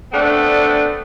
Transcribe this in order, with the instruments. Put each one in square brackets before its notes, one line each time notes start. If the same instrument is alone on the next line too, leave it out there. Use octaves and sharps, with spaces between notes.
[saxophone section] A3 B3 C4 D4